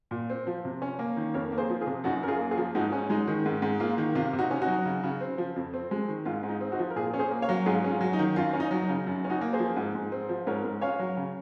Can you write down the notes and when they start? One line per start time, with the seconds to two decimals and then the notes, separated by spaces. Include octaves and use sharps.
0.11 A#2
0.30 C4
0.47 F3
0.65 C3
0.82 C#4
0.99 A#3
1.17 D#3
1.34 F2 A#4 C#5
1.52 A#3
1.58 G#4 C5
1.70 F3
1.81 F4 G#4
1.87 C3
2.04 F#2 D#4 F#4
2.23 F#2 A#4
2.28 F4 G#4
2.39 A#3
2.51 F4 G#4
2.58 F3
2.75 G#2 D#4 F#4
2.92 C#4
3.10 G#3 D#4
3.28 D#3
3.46 G#2
3.62 G#2
3.80 A#3 F4
3.98 D#3
4.15 C3 F4
4.33 C3
4.39 D#4 F#4
4.51 C#4
4.62 D#4 F#4
4.68 F#3
4.85 C#3
5.03 C#3
5.21 C4
5.38 F3
5.56 F2
5.74 C4
5.91 G#3
6.08 D#3
6.25 G#2 F4
6.43 G#2
6.49 D#4
6.61 C4
6.72 D#4 F#4
6.79 F3
6.90 A#4
6.96 A#2 F4 G#4
7.14 C#4
7.19 G#4 C5
7.31 A#3
7.42 C#5 F5
7.49 F#3
7.66 G#2 F4 G#4
7.84 C#4
7.90 F4
8.01 F#3
8.13 D#4
8.19 D#3
8.36 F#2 F4
8.53 C#4
8.60 D#4
8.71 F#3
8.82 D#4
8.89 C#3
9.07 F#2
9.25 C#4
9.30 D#4 F#4
9.41 A#3
9.53 G#4 C5
9.59 F3
9.77 G#2
9.95 G#2
10.12 C4
10.29 F3
10.47 G#2 A#4 C#5
10.65 G#2
10.81 C#4 C#5 F5
10.99 F#3
11.17 C#3